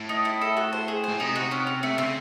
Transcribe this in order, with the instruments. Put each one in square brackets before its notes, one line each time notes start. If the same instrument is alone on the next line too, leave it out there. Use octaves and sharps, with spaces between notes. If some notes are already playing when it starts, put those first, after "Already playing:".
Already playing: [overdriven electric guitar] A2
[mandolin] D#4
E4
A4
F#4
C5
G#4
C5
[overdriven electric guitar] A2
[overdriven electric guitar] C3 [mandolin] D#4
[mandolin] F#4
C#4
C#4
[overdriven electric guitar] C3 [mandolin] A3
[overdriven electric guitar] C#3 [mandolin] C4